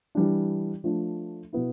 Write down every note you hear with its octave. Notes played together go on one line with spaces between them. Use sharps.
E3 G3 D4
F3 A3 D4
B2 B3 E4